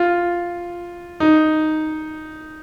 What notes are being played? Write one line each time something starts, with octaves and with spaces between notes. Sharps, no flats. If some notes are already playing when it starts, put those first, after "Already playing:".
Already playing: F4
D#4